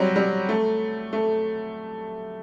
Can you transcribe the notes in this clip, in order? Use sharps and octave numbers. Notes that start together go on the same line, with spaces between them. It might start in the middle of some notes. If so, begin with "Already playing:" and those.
Already playing: F#3 G3 C4
G3
A3
A3